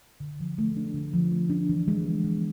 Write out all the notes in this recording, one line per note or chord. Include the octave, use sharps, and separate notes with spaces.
D3
F3
A3
D4
D3
F3
A3
D4
E3
G#3
B3
E3